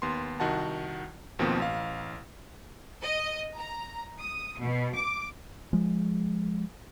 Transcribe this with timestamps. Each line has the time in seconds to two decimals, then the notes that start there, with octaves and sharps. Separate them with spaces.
0.02 D#2 B3 C6
0.40 C2 D#3 F#4 D#5 F#5 A5
1.39 D#2 B2 F3 A#3 C4
1.60 A1 F5
3.03 D#5
3.57 A#5
4.20 D#6
4.61 B2
4.95 D6
5.73 F3 G#3